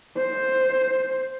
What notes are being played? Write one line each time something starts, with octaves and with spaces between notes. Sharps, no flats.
C5